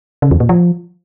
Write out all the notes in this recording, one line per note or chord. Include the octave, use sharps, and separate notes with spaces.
C#3
E2
A#2
F3